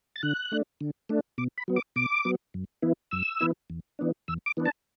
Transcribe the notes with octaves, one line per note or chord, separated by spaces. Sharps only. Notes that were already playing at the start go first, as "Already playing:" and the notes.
A6
D3 F#6
A3 D4
D3
A3 D4
B2 D6
B5
F#3 B3
D6
B2 D6
F#3 B3
F#2
E3 B3 E4
F#2 E6
E3 B3 E4
E2
E3 B3 D4
E2 E6
D6
E3 B3 D4
A5